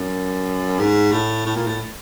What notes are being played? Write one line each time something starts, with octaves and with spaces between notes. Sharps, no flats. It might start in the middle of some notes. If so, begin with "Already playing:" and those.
Already playing: F#2
G#2
A2
A2
A#2
A2